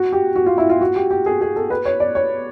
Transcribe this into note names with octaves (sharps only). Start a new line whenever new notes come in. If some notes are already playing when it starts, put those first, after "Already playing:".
Already playing: F#4
G4
F#4
F4
E4
F4
F#4
G4
G4
G#4
G#4
A4
B4
C#5
D5
C#5